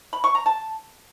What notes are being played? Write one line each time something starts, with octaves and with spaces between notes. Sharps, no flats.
B5
C#6
A#5
A5